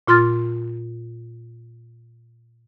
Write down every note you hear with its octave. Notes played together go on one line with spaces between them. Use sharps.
A#2 F4 C6 F6 A6